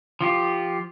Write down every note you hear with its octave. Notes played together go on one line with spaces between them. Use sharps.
F3 F4 G4